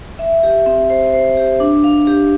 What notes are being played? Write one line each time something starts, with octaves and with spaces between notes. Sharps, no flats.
E5
G4
C4
C5
C5
G4
D4
F5
G4